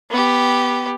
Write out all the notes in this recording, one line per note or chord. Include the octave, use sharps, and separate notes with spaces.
B3 G4